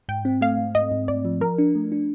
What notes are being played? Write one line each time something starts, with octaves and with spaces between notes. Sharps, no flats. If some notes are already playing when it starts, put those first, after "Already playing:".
G#2 G5
C4
A3 F5
G#2
G#2 D#5
G#2
G#2 D5
F3
F3 A#4
D4
A3
D4